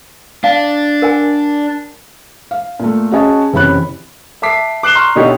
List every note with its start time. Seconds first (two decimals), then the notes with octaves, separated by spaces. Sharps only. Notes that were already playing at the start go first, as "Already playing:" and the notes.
0.44 D4 F5 A5
1.02 A#4 F#5 G#5
2.51 F5
2.79 A#2 A3
3.11 C#4 F#4 G#4 D#5 G#5 A5
3.53 F#1 C3 E3 C#5 B5 F#6
4.42 E5 A5 D6 B6 C7
4.83 D6 F#6 C7 E7 G7
4.95 A#5 C6 C#6 F6
5.16 B2 D3 D#4 E4 G4 C#5